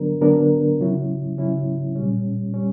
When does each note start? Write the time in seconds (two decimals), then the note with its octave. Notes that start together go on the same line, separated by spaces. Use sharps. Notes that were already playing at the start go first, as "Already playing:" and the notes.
Already playing: D3 F#3 B3 D4 A#4
0.21 D3 F#3 B3 D4 A#4
0.79 C#3 F#3 C#4 E4
1.38 C#3 F#3 C#4 E4
1.95 A#2 G3 C#4
2.54 G3 C#4